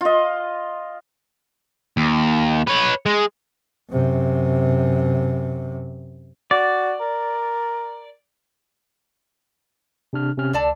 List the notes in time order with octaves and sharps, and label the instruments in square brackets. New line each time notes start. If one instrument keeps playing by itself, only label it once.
[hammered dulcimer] F4 D#5
[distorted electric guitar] D#2
B4 C#5
G#3
[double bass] F#2 C3
[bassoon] F#4 [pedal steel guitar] D5
[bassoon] A#4
[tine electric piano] C3 D4 F6
C3 C#4 F6
[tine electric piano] C#2 [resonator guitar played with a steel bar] D3 D5 A5